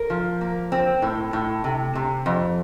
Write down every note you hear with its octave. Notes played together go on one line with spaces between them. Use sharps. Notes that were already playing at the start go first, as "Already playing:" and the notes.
Already playing: A#4
F3
A#3
C4
A2
A2
C3
C3
F2